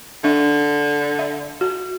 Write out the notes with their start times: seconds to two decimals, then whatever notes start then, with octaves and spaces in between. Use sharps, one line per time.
0.24 D3 D4 E5
1.19 E5
1.61 F#4